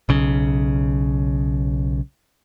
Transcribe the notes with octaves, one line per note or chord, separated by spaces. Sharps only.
B1 C#3